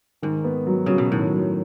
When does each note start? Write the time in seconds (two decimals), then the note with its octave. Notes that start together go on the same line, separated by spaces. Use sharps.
0.22 G#2 D#3
0.44 B3
0.67 F#3
0.86 C#3 F#3
0.98 B2
1.12 A2 D#3
1.33 F#3